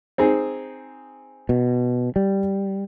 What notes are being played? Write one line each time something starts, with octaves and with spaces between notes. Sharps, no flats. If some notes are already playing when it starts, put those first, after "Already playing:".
C4 D#4 G#4
B2
G3